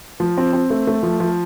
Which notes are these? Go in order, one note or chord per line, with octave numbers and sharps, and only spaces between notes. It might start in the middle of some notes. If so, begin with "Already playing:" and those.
F3
C4
C4
A3
A3
F3
F3